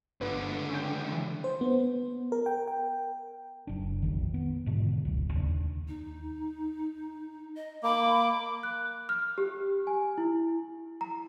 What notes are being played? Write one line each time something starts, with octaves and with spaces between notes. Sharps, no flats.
G1 C#2 D3 B4
C#4 G5
E3
C5
B3
A#4
G5
G5
F#1 D4
A#1 F2 D#3
B3
G#2 B2 D3
F1 C#2
D#2 A3 D4
D#4
D#5
A#3 B5 D6
F#6
F6
G4
G#5
E4
A#5